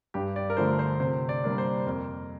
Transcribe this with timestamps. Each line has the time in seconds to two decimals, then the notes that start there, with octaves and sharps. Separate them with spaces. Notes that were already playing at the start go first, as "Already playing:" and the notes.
0.14 G2 G4
0.36 D5
0.50 A#4
0.57 D3 F3 A3 C5
0.79 C5
1.00 C3 C5
1.29 D5
1.44 G3 A#3 D4
1.52 A#4
1.58 C5
1.86 F2 A#4